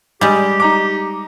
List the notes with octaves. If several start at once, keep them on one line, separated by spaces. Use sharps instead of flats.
G3 G#3 G4
D#4 A#5 D6